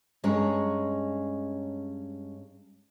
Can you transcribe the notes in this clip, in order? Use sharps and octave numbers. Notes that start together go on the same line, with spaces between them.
G2 G#3 C#4 C#5 A#5